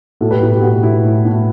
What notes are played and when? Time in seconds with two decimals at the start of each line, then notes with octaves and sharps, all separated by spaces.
0.21 A2 F#4 A4
0.31 G4 B4
0.41 A2 E4 G4
0.52 E4 G4
0.62 A2 F#4
0.83 A2 E4
1.04 A2
1.25 A2